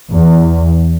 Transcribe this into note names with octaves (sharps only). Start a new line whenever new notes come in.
E2